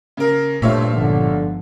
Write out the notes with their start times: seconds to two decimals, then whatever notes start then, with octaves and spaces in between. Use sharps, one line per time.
0.17 C#3 A#3 A#4
0.62 G2 A#2 A3 C4 F4 C#5 E5
0.95 G1 G#2 D3 F3